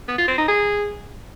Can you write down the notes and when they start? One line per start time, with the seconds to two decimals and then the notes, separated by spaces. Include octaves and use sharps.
0.08 B3
0.18 F4
0.28 C4
0.38 D#4
0.48 G#4